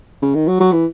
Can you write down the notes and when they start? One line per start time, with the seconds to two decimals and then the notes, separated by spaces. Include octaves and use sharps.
0.22 C#3
0.35 D#3
0.48 F#3
0.60 F#3
0.72 E3